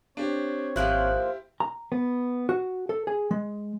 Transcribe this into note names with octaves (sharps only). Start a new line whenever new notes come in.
C4 D4 G4 C#5
G#1 F3 A#3 E4 G4 C5 F#6
A#5
B3
F#4
A4
G#4
G#3